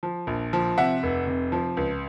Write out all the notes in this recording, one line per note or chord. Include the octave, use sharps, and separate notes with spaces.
F3
A#1
F3
C3 E5 F#5
F1
C3
F3
C#2